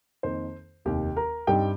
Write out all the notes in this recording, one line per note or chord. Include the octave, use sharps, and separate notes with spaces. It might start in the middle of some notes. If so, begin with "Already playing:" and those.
F2 D#3 A#3 C5
F1 D#2 D#3 G4 G5
A#4 A#5
G2 G3 C4 D#4 G4 G5